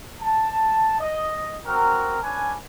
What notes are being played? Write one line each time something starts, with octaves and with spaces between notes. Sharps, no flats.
A5
D#5
C4 F#4 A#4
C#4 D4 B4 G#5